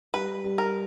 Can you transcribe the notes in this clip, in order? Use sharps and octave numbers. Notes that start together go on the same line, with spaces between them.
G3 B4
G3
A#4